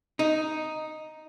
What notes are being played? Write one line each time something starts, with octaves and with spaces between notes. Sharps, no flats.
D#4